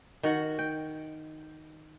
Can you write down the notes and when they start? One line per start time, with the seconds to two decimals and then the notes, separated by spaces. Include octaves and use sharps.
0.23 D#3 F#4 F#5
0.59 G5